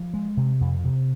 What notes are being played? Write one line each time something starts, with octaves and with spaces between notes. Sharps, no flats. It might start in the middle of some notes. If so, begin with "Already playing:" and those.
Already playing: F3
G#3
C3
F2
C3